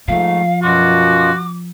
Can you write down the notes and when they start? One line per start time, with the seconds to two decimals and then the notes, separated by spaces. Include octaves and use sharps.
0.08 G#2 F3 A3 F5
0.62 F#2 B2 F4 F#4 D6